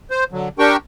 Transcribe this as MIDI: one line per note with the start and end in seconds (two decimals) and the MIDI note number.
0.11 0.24 72
0.32 0.49 50
0.32 0.49 54
0.59 0.76 62
0.59 0.76 67
0.59 0.76 70
0.59 0.76 79
0.59 0.76 85